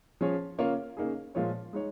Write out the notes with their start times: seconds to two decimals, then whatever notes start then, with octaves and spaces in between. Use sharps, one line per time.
0.21 F3 C#4 G#4 C#5
0.59 C#3 A#3 F4 C#5
0.97 C#3 A#3 D#4 G#4
1.35 A#2 F3 G#3 F4 C#5
1.73 G#3 D#4 C#5